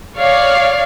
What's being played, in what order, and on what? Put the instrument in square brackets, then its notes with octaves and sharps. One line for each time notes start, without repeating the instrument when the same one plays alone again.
[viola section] C#5 D5 F5